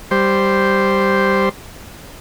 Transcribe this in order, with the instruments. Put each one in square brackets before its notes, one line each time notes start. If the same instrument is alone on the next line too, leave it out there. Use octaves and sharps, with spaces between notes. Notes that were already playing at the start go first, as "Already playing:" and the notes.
[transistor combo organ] G3 C5